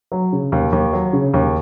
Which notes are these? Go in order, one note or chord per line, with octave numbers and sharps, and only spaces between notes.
F#3
C#3
D#2
D#2
F#3
C#3
D#2